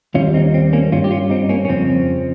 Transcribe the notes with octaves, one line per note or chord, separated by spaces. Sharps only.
D#2 D#3 G3 C#4 F4
C4 D#4
C4
A#3 C#4
G2 G3 C#4 F4
G4
C#4 F4
C4 D#4
A#3 C#4
C#4
F2 C#3 F3 C4